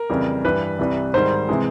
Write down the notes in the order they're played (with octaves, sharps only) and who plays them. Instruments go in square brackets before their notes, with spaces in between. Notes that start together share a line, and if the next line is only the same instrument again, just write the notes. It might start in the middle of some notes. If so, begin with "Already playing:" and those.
Already playing: [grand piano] A#4
F2 C#3 E3 G3
G2 E3 G3 B4
C2 C3 E3 G3
G#2 D#3 G3 C5
C3 E3 G#3